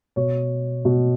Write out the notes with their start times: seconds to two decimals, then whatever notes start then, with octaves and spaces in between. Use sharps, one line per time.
0.16 B2 C#5
0.85 B2